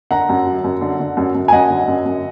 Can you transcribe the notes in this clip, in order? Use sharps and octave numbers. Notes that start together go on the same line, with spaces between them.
D3 F#5 A#5
F#2
F#3
F#2
D3
D3
F#2
F#2
G#5
F#2 D#5 F#5
D3
F#2
F#2